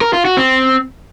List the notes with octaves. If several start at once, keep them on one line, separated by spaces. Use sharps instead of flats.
A#4
F4
F#4
C4